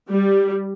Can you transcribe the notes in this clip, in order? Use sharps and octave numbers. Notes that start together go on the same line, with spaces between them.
G3